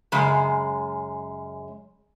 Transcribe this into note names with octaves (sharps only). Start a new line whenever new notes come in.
F#2 C#3 G#3